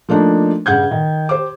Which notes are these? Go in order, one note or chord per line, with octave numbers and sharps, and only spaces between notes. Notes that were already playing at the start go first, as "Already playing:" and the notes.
F3 A3 A#3 D4 D#4
G2 C#3 F#5 G6 G#6
D#3
G4 C5 D6